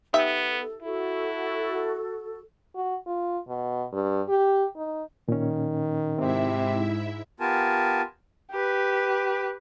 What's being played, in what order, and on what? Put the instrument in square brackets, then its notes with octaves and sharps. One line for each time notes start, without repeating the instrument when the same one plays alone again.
[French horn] B3 [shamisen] D#4 G4 E5 [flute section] A4
[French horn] E4 [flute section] F#4 A4
[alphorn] F#4
F4
B2
G2
G4
D#4
[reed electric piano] A#2 C#4 [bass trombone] D#3
[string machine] G#2 E4 E5 [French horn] C3 [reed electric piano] C4
[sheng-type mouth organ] B3 F4 G4 A#4 G#5 A5
[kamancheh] G4 B4